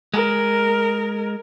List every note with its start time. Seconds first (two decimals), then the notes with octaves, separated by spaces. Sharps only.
0.14 G#3 A#4